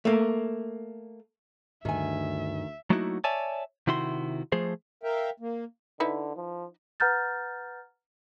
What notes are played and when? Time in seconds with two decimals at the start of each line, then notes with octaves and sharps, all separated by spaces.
0.05 A3 A#3
1.85 D2 G2 D#3 E5 G#5
2.90 F#3 A3 A#3 D#4 E4 F#4
3.24 C#5 D5 E5 G#5 A5
3.87 C3 D#3 E4 F#4 C6
4.52 F3 A3 G#4 C5
5.03 A#4 E5 F5 G5
5.40 A#3
6.00 D3 D#4 E4 B4
6.37 F3
7.00 B4 F#5 A#5 F6 G6 A6